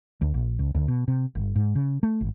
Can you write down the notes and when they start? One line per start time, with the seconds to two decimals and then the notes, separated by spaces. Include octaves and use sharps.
0.21 D2
0.34 A#1
0.59 C#2
0.75 D2
0.88 B2
1.08 C3
1.35 G1
1.56 G#2
1.75 C#3
2.03 A3
2.21 G#1